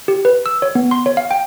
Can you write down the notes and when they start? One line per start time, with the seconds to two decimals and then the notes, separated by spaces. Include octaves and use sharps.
0.08 G4
0.25 B4
0.46 E6
0.62 C#5
0.75 B3
0.91 C6
1.06 C#5
1.17 F5
1.31 G5